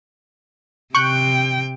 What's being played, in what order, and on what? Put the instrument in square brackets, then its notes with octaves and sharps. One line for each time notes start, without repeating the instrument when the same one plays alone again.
[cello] C3 G5 [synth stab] C#6 F#6 G6